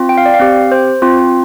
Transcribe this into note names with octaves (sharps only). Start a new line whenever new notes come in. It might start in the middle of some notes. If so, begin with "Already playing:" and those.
Already playing: C4 F4
G5
F5
D5
F5
C4 G4
C5
C4 F4